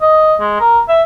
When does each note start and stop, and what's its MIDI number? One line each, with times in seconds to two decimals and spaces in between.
0.02 0.35 75
0.41 0.59 56
0.61 0.79 70
0.89 1.02 76